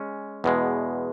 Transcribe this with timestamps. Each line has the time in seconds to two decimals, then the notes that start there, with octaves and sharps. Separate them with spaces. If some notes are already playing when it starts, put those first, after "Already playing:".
Already playing: G#3 C#4
0.44 E2 B2 G#3